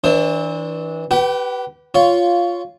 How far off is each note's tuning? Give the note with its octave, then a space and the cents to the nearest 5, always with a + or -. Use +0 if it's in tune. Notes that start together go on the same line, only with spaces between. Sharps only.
E3 -25 D4 +0 C5 +30
G4 -20 B4 +0 F#5 +45
F4 +0 C#5 +15